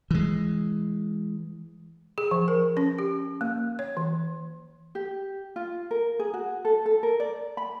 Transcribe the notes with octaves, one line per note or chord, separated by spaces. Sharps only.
E3 G#3
G#4
F3
A#4
C#4
G4
A#3
C#5
E3
G4
F4
A#4
G#4
F#4
A4
A4
A#4
D5
B5